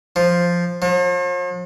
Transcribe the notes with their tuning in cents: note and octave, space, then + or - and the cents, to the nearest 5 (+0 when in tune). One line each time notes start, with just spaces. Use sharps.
F3 +0
F3 +45